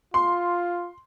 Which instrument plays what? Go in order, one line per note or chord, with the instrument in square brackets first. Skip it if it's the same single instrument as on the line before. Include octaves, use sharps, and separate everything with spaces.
[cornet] F4 [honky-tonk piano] C6